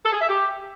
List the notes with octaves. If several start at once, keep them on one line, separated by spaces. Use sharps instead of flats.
A4
G#4
E5
G4